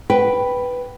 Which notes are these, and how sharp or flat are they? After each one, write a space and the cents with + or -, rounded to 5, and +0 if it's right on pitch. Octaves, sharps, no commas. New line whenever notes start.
B4 +0 G5 +0